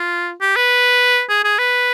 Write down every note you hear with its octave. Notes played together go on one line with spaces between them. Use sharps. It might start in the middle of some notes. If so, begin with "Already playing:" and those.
Already playing: F4
G4
B4
G#4
G#4
B4